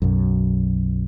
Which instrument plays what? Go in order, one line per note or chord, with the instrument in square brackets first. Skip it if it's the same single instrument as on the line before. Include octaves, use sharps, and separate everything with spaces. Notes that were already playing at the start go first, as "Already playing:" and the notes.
[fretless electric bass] B1 F#2